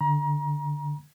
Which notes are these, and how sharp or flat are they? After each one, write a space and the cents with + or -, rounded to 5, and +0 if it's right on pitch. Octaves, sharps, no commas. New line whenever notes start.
D3 +0 A#5 +35